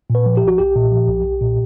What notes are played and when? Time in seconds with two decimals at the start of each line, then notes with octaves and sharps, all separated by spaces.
0.10 A#2
0.15 B4
0.26 F3
0.37 G4
0.43 B1 F#4
0.58 B1 G4
0.75 A#2
0.91 F3
1.08 B1
1.24 B1
1.41 A#2